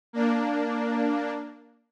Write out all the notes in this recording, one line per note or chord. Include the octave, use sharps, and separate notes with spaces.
A#3 D4